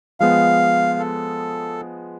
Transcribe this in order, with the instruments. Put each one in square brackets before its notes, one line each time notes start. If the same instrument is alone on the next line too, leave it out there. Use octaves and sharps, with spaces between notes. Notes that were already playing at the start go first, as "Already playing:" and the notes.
[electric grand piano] F3 G#3 B3 [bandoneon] F5
[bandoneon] A4